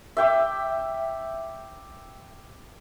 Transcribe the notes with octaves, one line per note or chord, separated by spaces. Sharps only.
E5 G5 D6